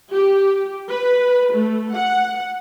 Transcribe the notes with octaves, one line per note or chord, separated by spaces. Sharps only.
G4
B4
A3
F#5